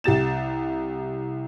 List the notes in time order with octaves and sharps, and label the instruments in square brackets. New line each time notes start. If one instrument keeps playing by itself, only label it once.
[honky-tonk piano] C2 G4 A6 E7